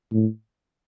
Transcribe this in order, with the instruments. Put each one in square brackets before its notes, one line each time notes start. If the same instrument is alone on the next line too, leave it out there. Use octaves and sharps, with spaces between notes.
[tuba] A2